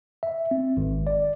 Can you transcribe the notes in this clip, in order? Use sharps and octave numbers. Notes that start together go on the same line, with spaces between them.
E5
C4
G#1
D5